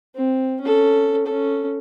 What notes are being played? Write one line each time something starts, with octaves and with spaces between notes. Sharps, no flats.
C4
C#4 A4
C#4 A4